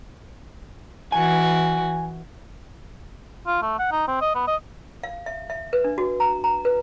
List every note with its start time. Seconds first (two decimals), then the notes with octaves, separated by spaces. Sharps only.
1.12 E3 F#4 G#5
3.47 F4
3.62 A3
3.79 F#5
3.92 D#4
4.08 C4
4.21 D#5
4.35 B3
4.48 D#5
5.03 F5
5.26 E5
5.50 E5
5.73 B4
5.84 D4
5.98 F#4
6.20 A#5
6.44 A#5
6.65 B4